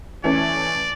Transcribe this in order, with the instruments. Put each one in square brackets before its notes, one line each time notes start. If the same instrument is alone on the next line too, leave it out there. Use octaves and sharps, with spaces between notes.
[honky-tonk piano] E3 A3 C#4 [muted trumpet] D5